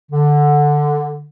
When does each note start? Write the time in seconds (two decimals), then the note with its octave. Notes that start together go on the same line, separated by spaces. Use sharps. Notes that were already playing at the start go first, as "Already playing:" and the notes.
0.12 D3